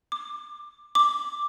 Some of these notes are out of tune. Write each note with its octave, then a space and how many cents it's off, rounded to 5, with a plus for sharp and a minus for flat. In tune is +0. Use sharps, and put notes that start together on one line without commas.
D6 +20
D6 +0